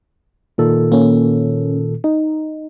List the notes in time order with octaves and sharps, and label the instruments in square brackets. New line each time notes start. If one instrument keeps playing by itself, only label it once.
[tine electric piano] A#2 D#3 A4
[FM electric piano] A#3 C#4
D#4